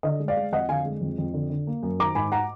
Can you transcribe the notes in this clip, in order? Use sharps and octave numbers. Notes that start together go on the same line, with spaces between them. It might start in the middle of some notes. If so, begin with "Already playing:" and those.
D3 D#5
G#3
D5 F5
G#3
F2 D#5 F#5
D3 F5 G#5
G#3
F2
F2
D3
D3
A#3
F#2
D#3 A#5 D6
G#2 G#5 B5
F#5 A#5